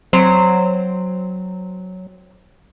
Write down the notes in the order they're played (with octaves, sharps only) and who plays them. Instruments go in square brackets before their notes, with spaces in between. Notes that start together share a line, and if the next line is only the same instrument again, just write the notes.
[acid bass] F#3 [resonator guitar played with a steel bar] C4 C5